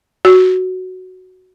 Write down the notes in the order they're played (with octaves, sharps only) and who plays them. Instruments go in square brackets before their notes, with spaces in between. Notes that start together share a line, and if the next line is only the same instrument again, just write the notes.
[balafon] F#4